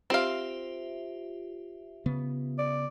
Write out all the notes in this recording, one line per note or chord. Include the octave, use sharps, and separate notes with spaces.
C4 F4 G4 E5 F5
C#3 B3
D5